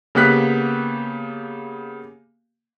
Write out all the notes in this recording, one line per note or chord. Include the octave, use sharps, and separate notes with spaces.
C#3 A#3 B3 G4 F#6 B6